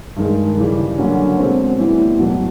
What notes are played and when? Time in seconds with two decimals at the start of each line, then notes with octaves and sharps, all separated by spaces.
0.16 G2 D#3 G#3
0.57 C#3 E3 G3
0.98 D3 F#3 A#3 C#4
1.39 B2 G#3 C4
1.79 A2 E3 G3 B3 E4
2.19 E2 B2 F#3